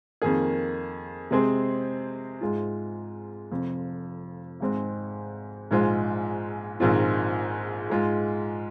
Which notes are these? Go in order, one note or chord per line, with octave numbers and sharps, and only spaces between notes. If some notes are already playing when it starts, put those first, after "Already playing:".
F2 D#3 A#3 G#4
C3 G#3 C4 G#4 C5
G#2 G#3 F4
F1 F2 F3
G#1 G#2 G#3 C4
A#1 G#2 G#3 F4 C5
A#1 G#2 D#3 C4 F4
G#2 G#3 F4